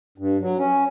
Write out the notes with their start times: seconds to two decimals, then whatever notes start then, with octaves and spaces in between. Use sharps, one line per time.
0.18 G2
0.40 F#3
0.58 C#4